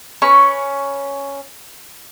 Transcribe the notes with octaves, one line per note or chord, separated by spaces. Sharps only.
C#4 B4 C#6